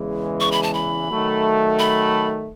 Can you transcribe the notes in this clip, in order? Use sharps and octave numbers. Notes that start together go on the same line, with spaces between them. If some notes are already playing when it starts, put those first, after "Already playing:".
Already playing: E2 C#3 E3 G#3
C#6
B5
A5
B5
D#3 F#3 A3
B5